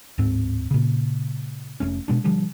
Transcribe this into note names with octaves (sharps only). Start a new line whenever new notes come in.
D1 G#2 C4
A#2 C#3
F1 G2 A3 C#4
B2 G#3 D4
B2 D3 F3 G3